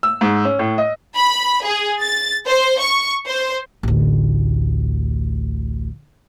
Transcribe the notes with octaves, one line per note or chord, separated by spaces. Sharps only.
E6
G#2
C#4
A2
D#5
B5
G#4
A6
C5
C#6
C5
A1 D2